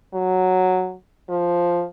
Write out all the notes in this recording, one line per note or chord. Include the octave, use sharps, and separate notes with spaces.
F#3
F3